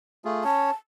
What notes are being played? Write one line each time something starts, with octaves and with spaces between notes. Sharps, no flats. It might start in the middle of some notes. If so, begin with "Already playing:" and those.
A3 F4 G#4
C#4 C#5 A5